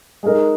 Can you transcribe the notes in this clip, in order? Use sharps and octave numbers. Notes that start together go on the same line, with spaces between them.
G#3 D#4 A#4